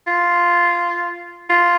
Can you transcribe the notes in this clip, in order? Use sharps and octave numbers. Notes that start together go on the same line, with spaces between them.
F4
F4